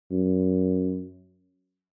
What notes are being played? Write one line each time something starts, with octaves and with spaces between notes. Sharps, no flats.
F#2